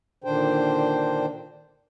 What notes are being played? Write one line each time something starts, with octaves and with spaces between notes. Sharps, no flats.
A#2 D3 D#3 D4 C5 G5